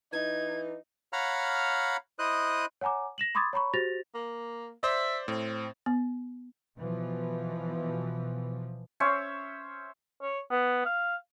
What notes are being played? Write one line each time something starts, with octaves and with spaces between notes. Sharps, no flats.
E3 D#4 G#6
C#5 F5 F#5 A#5 B5 F6
E4 C5 D#5 D#6 F#6
C#5 F#5 G#5 A#5 D6
A#6 E7 F#7
B5 C6 D6 D#6 G#6 A6
C#5 A#5 B5 C#6
F#4 G4 C5 A6 A#6 F7
A#3
C5 D5 E5
A2 C4
B3
B2 E3 F3
C#4 C5 C#5 E5
C#5
B3
F5